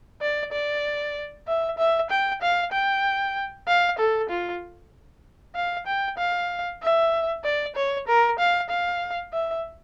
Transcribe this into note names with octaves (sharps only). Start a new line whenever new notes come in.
D5
D5
E5
E5
G5
F5
G5
F5
A4
F4
F5
G5
F5
E5
D5
C#5
A#4
F5
F5
E5